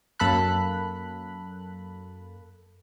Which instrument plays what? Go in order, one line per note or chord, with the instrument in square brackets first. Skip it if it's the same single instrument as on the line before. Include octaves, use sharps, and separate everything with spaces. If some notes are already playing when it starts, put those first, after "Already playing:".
[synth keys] F#2 A#3 A4 B5 F#6